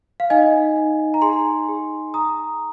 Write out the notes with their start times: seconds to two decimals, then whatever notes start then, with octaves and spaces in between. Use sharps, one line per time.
0.20 F5
0.30 D#4 D#5 G#5
0.76 D#4
1.14 A#5
1.22 G#4 G#5 C6
1.69 G#4
2.13 G#4 A#5 D#6